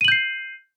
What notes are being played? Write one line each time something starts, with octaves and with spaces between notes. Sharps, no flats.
G6 C7 D#7 F#7